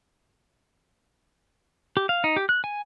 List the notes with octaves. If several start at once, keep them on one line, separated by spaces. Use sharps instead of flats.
G4
F5
D#4
G4
F#6
G#5